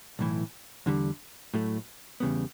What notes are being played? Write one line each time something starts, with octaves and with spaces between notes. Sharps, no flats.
B1 A2 E3
E2 D3 G3
A2 F#3 A3
E2 C#3 G3 B3